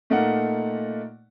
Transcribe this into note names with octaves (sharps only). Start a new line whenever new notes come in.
A#2 A3 A#3 D#4 F#5